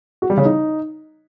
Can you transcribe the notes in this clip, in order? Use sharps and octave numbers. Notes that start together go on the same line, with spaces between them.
F#4
G3
C#3
D#4